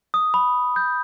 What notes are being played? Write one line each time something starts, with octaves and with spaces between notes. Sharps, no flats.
D#6
B5
G6